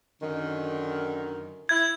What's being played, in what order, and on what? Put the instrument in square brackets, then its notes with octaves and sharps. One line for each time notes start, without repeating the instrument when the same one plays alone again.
[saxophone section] F#2 D3 D#3
[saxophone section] E4 [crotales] G#6